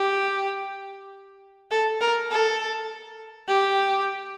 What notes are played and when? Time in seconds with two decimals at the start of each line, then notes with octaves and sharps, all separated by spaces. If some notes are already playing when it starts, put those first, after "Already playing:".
Already playing: G4
1.71 A4
2.01 A#4
2.31 A4
3.48 G4